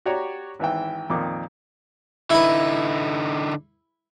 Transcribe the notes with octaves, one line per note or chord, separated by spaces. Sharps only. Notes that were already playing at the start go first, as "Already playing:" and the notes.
F#4 G4 C#5 D5 A#5
G#1 E3 E5 G5
F2 A#2 D#3 D6
D3 D#4 E4 B4